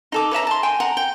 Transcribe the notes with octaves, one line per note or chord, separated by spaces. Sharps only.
D#4 A4 D6
B4 C#5 E5 A#5
A5 C6
G5 G#5 C6
F#5 A#5
G5